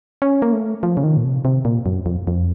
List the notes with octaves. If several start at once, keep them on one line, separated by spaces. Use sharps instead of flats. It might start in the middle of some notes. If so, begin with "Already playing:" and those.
C#4
A#3
A3
F3
C#3
D#3
A#2
C3
C3
A#2
F#2
F2
F2